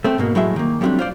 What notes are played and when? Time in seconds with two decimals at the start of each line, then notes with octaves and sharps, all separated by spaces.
0.04 A3 C4
0.18 G#2 B2 A#3
0.35 A2 F#3 G#3 E5
0.56 D#3 A#3
0.81 F#3 G3 A3 A#3 C4 D4
0.99 F4 C5 D5